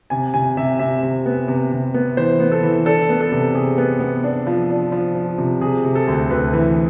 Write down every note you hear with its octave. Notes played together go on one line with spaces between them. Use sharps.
C3 G#5
C3 G#5
C3 E5
C3 E5
C3
B3
C3
C3
B3
E3 C5
B3
A4
E3
D4 A4
B3
A4
C3
C3 G#4
B3
B3
D4
F3
D4
F3
F3
C3
C3 G#4
C3
A4
D2
D2 B4
E3